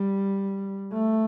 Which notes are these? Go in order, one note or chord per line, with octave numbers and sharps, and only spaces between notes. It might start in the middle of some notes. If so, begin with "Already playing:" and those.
Already playing: G3
A3